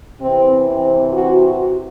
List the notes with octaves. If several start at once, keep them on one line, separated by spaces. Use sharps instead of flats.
C3 E3 C4
C4
F#4
F#4